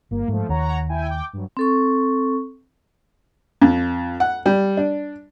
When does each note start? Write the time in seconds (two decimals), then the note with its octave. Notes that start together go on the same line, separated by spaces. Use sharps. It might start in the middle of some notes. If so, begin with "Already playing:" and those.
0.11 G1 A#3
0.28 G#2 F3 A3
0.49 D#2 C#5 F#5 A#5
0.89 E4 G5 G#5
1.08 G5 D6
1.33 G2 F#3
1.57 C4 A4 C#6
3.61 F2
4.20 F#5
4.46 G3
4.77 D4